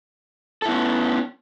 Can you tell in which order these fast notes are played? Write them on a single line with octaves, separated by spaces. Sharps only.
A4 E4 B3 C#4